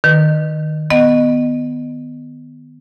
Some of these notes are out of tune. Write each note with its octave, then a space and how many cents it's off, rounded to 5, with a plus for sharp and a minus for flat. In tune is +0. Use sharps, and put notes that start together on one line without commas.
D#3 -20 B4 -5
B3 +5 D#5 -20 F#5 +25